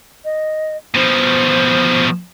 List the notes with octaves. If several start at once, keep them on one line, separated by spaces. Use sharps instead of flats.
D#5
B2 F3 C5